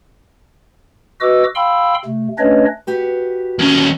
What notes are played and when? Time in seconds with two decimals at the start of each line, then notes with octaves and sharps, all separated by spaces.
1.21 F#4 B4 D#5 D6 E6
1.55 F5 G5 B5 C6 E6
2.05 C3 A3
2.38 A3 C#4 D4 B4 C#5 D#5
2.87 F#4 G4 B4
3.59 D#2 C#4